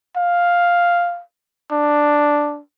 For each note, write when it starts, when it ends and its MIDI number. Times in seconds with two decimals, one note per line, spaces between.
0.16 1.22 77
1.72 2.59 62